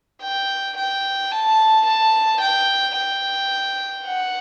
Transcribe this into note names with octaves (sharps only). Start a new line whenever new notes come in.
G5
G5
A5
A5
G5
G5
F#5